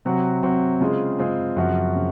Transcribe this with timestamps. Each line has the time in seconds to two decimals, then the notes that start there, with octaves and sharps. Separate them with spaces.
0.05 C3 F#3 C4 F#4
0.42 C3 F#3 C4 F#4
0.81 C#3 G#3 C4 F4 G#4
1.19 C#3 G#3 C4 F4 G#4
1.56 F#2 C#3 F3 C4 F#4
1.96 C#3